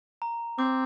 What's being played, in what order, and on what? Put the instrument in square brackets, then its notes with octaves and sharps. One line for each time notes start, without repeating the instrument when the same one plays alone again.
[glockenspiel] A#5
[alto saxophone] C4 [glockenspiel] D6